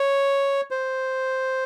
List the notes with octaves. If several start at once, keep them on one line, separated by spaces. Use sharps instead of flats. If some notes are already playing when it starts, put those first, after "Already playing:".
Already playing: C#5
C5